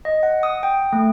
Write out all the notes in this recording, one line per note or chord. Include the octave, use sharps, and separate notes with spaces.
D#5
F#5
D#6
G5
A3